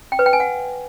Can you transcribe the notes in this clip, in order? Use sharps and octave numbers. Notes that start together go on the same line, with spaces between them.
G5
B4
G5
G#5
F#5